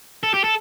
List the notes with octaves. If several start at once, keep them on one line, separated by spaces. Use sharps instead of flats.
A4
G4
A4